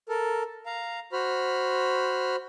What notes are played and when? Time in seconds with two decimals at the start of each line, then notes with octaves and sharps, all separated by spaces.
0.09 A4 A#4
0.66 F5 A#5
1.12 F#4 C5 B5 F6